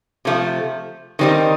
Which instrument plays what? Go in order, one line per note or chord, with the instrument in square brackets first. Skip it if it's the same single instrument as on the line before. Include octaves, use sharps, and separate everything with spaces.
[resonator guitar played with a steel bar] C3 F3 A3
D#3 G3 C4 D#4